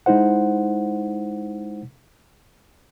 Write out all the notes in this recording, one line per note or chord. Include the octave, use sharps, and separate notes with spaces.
G#3 D#4 E4 C5 F#5